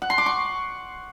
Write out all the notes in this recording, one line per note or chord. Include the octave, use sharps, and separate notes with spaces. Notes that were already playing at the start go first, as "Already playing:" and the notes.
F#5
C6
D6
C#6